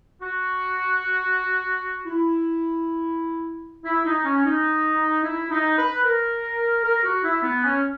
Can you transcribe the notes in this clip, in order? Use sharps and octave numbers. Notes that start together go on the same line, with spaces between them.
F#4
E4
E4
D#4
C#4
D#4
E4
D#4
B4
A#4
A#4
F#4
E4
B3
C#4